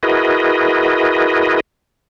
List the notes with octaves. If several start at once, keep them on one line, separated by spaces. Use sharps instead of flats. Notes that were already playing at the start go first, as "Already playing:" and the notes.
E4 F#4 G#4 A#4 B4 D#5